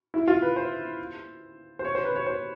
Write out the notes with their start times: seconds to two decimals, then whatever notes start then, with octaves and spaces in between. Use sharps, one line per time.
0.14 E4
0.28 F4
0.42 B4
0.56 C5
1.79 C5
1.85 C#5
1.95 C5
2.05 B4
2.16 C#5
2.26 C5